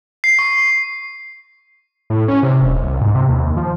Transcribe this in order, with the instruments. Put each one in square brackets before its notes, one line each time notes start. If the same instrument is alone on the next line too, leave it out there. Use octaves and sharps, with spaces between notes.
[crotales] C7
C#6
[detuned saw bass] A2
C#4
C3
D#1
C2
G#2
C3
D#2
D#2
F3